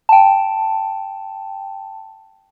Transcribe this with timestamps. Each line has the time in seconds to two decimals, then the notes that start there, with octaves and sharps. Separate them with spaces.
0.09 G5 A5